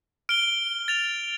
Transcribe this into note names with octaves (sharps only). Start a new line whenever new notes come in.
F6 D7 G7
A6 F7